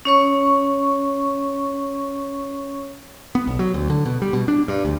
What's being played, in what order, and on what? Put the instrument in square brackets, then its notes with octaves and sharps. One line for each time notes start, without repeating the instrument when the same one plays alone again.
[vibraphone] C#4 C#5 C#6
[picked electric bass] B3
B1
F#3
D2
D3
B2
G3
B2
D4
G2
D2